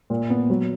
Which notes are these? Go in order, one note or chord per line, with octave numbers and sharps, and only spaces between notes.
A#2
B3
F#3